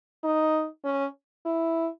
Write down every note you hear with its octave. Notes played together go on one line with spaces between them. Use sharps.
D#4
C#4
E4